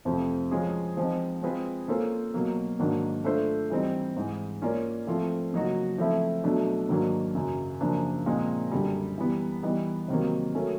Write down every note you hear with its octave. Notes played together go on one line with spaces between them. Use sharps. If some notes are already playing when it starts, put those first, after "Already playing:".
F2 C3 F3 A3
F3 G#3 C#4 F4 G#4
F3 G#3 C4 D#4
G#3 C4 F4 G#4 B4
A#3 C#4 F4 A4 C5
B2 F#3 A#3
G#2 D#3 F#3 A#3 D4
A3 D4 F4 A4 C5
E3 G3 C4 D#4
G#2 E3 G#3
A#3 C#4 F4 A#4 D5
F3 A3 C4 F4
C#3 F#3 A#3 D#4 F#4
F3 A3 C4 E4
B2 F#3 A3 D4
G#2 D#3 F#3 A#3 D4
F#2 C#3 F#3
F#2 C#3 F3 A#3 D4
A#2 F3 G#3 C4 D#4
F#2 D3 G3
E3 G3 B3
E3 G3 B3 D#4
C3 D#3 F#3 A#3
A3 C#4 F#4 A#4